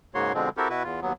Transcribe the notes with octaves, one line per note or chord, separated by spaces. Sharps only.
G#2 C#3 A#3 F#4 C#5 C6
B2 D3 F3 G#3 C4
C4 E4 F#4 G4 A4 A#4
B2 E4 F#4 B4
E2 F4
D#2 F#3 B3